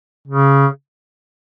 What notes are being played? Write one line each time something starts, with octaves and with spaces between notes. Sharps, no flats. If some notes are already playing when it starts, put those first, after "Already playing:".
C#3